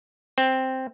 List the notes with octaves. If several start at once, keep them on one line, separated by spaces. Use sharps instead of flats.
C4